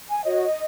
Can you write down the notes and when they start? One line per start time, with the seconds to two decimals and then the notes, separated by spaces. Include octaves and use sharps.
0.09 G#5
0.23 F#4 C#5 D#5